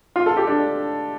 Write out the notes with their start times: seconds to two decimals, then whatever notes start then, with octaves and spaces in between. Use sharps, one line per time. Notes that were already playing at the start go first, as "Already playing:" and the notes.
0.16 F4
0.26 A4
0.37 G4
0.47 D4